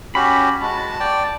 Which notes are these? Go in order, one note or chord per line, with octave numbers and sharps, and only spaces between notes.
C#4 F#4 G4 B5
G#3 F#4 A5
D5 G5